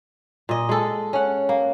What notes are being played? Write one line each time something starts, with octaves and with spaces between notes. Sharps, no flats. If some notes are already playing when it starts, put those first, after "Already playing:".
A#2 D#5
G#3 A4
C#4 F#5
A#3